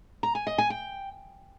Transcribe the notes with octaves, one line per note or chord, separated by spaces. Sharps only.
A#5
G#5
D#5
G#5
G5